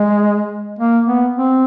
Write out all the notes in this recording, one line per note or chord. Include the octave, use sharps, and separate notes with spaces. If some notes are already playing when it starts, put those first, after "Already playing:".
Already playing: G#3
A#3
B3
C4